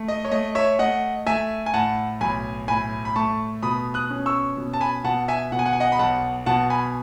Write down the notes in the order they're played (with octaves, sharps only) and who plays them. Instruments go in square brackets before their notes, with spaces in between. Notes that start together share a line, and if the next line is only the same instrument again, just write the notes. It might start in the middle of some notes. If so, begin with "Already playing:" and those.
Already playing: [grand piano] A3
D#5
C#5
A3 D#5
C#5 E5
A3 D#5 F#5
A3 E5 G#5
G#5
A2 F#5 A5
B1 G#5 B5
A2 G#5 B5
B5
A3 A5 C#6
B2 B5 D#6
D#6 F#6
C#4
C#6 E6
B2
A5
G#5 B5
B2 F#5 A5
E5 G#5
B2 F#5
G#5
F#5
G#5
D#5 F#5
B5
B1 F#5 A5
B2 F#5 A5
G#5 B5